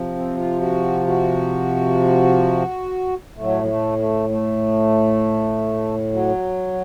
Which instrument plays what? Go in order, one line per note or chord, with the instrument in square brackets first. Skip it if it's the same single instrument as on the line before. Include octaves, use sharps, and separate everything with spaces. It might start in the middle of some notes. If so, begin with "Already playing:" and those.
Already playing: [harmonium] C3 F3
C4
F4
F#4
F#4
A2 F#3 A3
F#3
A3
A3
A3
F#3